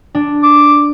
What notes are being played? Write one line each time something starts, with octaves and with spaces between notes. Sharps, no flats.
D4
D6